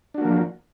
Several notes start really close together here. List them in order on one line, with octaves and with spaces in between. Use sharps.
D4 F#4 A#3 F3